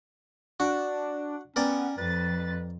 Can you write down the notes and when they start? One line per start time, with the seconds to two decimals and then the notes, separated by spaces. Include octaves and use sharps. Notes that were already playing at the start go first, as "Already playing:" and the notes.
0.60 D4 F#4
1.56 B3 C#4 A#4 D5 G5
1.98 F2 B4 A6